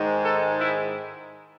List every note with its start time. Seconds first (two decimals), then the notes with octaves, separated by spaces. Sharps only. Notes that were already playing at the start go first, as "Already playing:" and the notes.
Already playing: G#2 D#3 G#3
0.25 A4
0.61 E4